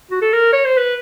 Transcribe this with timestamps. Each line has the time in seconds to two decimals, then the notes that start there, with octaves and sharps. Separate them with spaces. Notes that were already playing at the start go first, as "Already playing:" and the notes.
0.11 F#4
0.22 A4
0.33 A#4
0.53 C#5
0.65 C5
0.77 B4